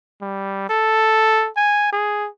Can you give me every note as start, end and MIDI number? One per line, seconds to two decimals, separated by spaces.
0.22 0.69 55
0.69 1.49 69
1.57 1.89 80
1.93 2.29 68